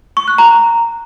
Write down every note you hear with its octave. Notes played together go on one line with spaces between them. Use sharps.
C#6
F#6
A#5